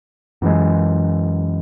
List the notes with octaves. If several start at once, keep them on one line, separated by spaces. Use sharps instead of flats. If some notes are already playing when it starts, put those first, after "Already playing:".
F#2 E3 G#3